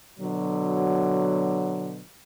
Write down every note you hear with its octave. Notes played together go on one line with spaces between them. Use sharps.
B2 D3 F#3